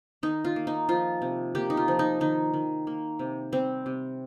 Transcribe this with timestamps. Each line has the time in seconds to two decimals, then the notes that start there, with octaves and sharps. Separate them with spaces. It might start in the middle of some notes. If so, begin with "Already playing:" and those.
0.23 D#3 D#4
0.45 F4
0.56 A#3
0.67 D#4
0.89 F3 F4
1.22 C3
1.55 A#3 G4
1.70 D#4
1.77 F4
1.88 F3
1.99 D#4
2.20 D#3 D#4
2.54 D#3
2.87 A#3
3.19 C3
3.53 G3 C4
3.86 C3